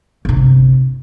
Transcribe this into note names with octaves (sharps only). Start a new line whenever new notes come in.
G1 C3